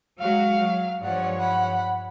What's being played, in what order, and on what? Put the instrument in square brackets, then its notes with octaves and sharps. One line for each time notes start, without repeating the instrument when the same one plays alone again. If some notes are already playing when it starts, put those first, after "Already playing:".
[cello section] F#3 G#3 F#4 [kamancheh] F5
[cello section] F#3
[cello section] G2 F3 C#5 [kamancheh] D5 F#5
[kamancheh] F#5 B5